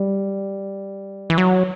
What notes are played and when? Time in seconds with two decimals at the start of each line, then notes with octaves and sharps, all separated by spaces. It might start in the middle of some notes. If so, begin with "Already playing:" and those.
Already playing: G3
1.30 E3
1.38 F#3